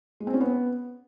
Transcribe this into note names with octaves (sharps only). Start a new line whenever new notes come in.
G#3
C4
C#4
B3